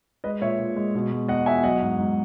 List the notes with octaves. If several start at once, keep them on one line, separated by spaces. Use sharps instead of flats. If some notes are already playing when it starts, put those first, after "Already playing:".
G#3 B4 D#5
A#2 C#5 E5
A#2
G#3
B2
G#3
E2 D#5 F#5
E2 E5 G#5
F#3 D#5 F#5
G#2
G#2